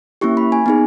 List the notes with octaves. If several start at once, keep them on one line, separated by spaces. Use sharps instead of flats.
A#3 C#4 E4 G4 C#6
B5
G#5
B3 D#4 G#4